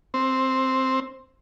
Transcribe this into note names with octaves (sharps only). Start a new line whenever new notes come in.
C4